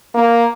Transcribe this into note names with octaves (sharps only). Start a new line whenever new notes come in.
A#3